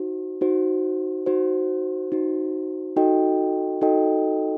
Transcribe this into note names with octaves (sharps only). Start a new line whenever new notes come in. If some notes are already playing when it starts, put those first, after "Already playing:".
Already playing: D#4 F#4 C5
D#4 F#4 C5
D#4 F#4 C5
D#4 F#4 C5
D#4 F#4 A4 D#5 G5
D#4 F#4 A4 D#5 G5